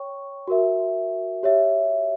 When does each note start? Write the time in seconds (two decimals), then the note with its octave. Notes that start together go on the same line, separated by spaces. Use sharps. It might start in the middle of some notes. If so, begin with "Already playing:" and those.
Already playing: C#5 G5 C#6
0.48 F#4 A#4 E5
1.43 G4 C#5 E5